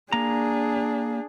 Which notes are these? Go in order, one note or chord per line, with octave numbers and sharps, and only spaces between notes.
A#3 D4 G#4 A#5